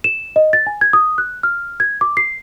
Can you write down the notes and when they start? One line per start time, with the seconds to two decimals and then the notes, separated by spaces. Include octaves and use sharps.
0.04 E7
0.36 D#5
0.53 A6
0.67 G#5
0.81 G#6
0.93 D#6
1.18 F#6
1.43 F6
1.80 G#6
2.01 D6
2.17 C7